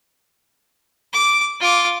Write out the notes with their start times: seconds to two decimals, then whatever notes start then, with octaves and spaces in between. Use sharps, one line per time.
1.13 D6
1.60 F4 D6